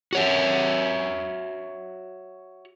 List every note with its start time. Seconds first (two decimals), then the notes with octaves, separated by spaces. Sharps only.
0.13 F#4 C#5 E5